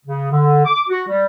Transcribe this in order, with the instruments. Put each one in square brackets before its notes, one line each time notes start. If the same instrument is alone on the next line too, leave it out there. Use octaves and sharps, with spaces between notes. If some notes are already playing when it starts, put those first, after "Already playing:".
[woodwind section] C#3
D3
D6
F#4
G3